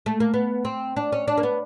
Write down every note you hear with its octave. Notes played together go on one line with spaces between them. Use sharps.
A3
A#3
B3
C4
D4
C#4
D4
A#3
B3